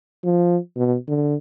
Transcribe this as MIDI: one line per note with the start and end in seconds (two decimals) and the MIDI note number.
0.24 0.57 53
0.77 0.96 47
1.08 1.35 50